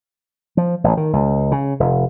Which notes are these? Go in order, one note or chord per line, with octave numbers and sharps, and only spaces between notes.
F3
A1
D#3
C#2
C#3
F1